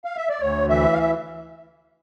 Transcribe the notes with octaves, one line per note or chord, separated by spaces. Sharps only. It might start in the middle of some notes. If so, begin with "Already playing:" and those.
F5
E5
D5
D2 C#5
E3 E5
F5
E5